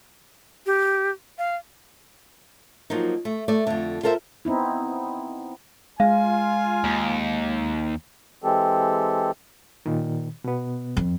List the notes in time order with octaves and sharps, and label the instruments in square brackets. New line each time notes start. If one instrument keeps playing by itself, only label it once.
[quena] G4
F5
[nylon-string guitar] F3 F#3 A#3 D#4
A3
A3 D5
F2 D3
F4 A4 A#4 C5 E5
[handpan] B3 C4 D#4 E4
[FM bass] G#3 [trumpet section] F4 G#5 [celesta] F5
[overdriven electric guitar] D#2
[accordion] E3 G#3 C4 G4 A4
[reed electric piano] A#2 D#3
B2 B3
[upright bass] F2